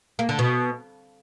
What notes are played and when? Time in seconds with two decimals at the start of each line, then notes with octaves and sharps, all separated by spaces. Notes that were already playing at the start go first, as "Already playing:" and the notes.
0.19 A#3
0.29 D3
0.39 B2